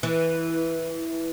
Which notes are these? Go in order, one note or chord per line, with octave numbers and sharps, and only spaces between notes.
E3